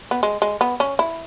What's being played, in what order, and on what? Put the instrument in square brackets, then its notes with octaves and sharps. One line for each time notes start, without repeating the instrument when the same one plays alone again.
[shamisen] B3
G#3
G#3
B3
C#4
E4